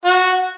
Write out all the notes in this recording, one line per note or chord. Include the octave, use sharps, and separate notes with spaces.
F#4